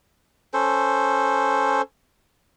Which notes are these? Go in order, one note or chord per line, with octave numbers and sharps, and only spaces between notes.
C#4 A4 C5